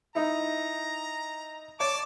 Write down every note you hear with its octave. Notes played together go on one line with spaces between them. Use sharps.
D#4 E4 A#5
C#5 D5 A5 D6